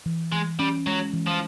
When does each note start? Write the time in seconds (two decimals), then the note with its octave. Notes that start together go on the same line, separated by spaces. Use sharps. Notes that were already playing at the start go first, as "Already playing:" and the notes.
0.06 E3
0.32 E3 G#3
0.59 G3 C#4
0.87 F#3 G#3
1.13 E3
1.27 F3